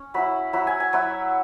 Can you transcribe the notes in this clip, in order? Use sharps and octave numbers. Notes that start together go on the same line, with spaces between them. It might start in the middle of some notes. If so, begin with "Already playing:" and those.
Already playing: C#4
F#3 E4 B5
F#3 E4 B5
G#5
G#5
F#3 E4